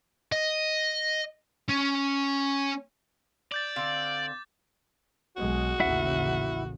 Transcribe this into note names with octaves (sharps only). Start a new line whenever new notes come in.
D#5
C#4
D5 D6 G6 A6
D3 C4 F5
B1 G#3 F#4
A1 D#2 C#3 E4 E5 F#5